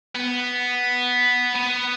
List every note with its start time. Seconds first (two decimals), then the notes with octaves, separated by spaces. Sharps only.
0.15 B3
1.56 B3